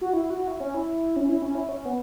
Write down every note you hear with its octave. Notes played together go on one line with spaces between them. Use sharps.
F#4
E4
F#4
E4
C#4
E4
C#4
E4
C#4
E4
C#4
B3